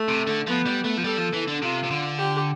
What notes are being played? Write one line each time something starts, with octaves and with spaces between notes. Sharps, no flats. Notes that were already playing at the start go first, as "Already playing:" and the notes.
Already playing: A3
C3
D3
F3 B3
G3
A3
F3
G3 A4
F3
E3
D3
C3 F4
C3
D3
G4